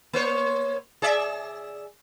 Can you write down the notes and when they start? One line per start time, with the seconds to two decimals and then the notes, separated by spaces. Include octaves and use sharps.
0.13 A#3 C5 C#5
1.02 G#4 D5 E5